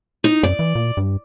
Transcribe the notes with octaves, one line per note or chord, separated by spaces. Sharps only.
D#4
F#2 D5
E3
A#2
G2